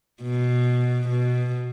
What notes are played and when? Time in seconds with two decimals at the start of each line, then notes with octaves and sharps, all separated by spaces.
0.23 B2
1.09 B2